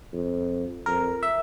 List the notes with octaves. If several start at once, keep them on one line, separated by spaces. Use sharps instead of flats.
F2
F2 A#4
E5